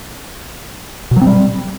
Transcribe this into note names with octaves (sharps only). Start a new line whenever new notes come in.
B2
F#3
C4
G3